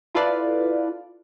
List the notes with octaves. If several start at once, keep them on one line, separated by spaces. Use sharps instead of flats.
E4 F4 A4 B4 D5 F5